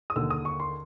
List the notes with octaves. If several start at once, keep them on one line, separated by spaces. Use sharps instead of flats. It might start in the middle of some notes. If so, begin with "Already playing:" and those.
D#6
D#2 D3 E6
D#6
C#6
C6